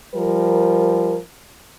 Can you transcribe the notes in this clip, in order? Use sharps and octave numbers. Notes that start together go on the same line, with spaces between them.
F3 G3 A#4